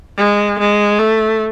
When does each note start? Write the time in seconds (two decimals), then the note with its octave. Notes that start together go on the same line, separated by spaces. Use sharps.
0.18 G#3
0.59 G#3
0.99 A3